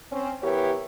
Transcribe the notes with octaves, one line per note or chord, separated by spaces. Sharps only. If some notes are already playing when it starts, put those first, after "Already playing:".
C4 C#4
E3 B3 G4 A#4 C#5